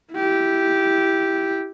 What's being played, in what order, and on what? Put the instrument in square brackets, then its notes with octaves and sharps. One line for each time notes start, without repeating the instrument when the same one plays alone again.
[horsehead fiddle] E4 G4